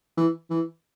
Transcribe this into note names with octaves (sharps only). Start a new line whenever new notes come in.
E3
E3